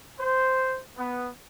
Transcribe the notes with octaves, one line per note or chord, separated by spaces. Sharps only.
C5
B3